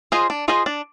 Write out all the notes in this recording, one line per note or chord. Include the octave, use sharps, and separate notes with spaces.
F4 G#4 C5 D#5
D4
F4 G#4 C5 D#5
D4